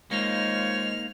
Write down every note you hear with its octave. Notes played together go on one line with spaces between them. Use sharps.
G#3 A#3 D#4 F4 C5 C#5 F6